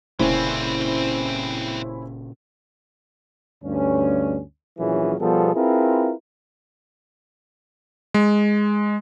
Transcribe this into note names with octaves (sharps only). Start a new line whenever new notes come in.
F1 A#2 C#3 E3 C4 C#4 E4 C5
D2 G2 C#4
A#1 A#2 E3 F#3 C#4 G#4
B2 F3 G3 B3 G#4 A4
C4 E4 F4 G#4 A#4 B4
G#3